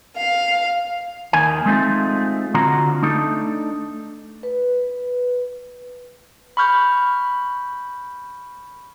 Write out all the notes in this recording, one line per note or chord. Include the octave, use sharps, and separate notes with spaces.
F5
D#2 D#3 G#5
G#3 A3 C4 D#4 F4
D3 C4 F4 F#4 A#5
A3 D4 D#4 A4
B4
B5 C#6 F6 G6